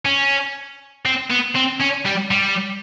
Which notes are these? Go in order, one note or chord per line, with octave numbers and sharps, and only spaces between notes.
C#4
C4
B3
C4
C#4
G3
G3